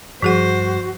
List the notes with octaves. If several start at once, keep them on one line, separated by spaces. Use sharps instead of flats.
G2 F3 G3 F#4 G#4 C5 F#5